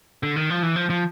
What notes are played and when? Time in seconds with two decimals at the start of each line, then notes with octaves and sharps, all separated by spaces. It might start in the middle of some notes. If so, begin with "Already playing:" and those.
0.23 D3
0.36 D#3
0.50 F3
0.63 E3
0.76 F3
0.90 F3